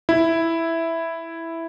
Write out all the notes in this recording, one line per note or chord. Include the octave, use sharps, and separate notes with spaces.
E4